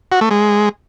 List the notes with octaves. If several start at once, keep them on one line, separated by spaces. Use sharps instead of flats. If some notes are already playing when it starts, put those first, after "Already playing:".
F#4
A3
G#3